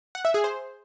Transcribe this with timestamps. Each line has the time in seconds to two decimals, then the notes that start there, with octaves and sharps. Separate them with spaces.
0.15 F#5
0.25 E5
0.34 G#4
0.44 C5